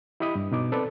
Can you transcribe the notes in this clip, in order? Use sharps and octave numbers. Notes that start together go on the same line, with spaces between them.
E4 G4 D#5 B5 D#6
G2
B2 D#4 D6
C4 A4 B4 D5